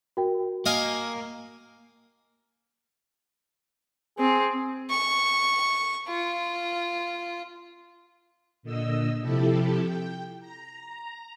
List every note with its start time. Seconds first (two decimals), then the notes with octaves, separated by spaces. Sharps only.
0.17 F#4 A#4 G5
0.66 A#3 D#5 F5 G#5
4.18 C4 G#4
4.90 C#6
6.08 F4
8.63 A#2 D3 D#5 E6
9.21 C3 F3 E4 G4 A4
9.81 G5
10.40 A#5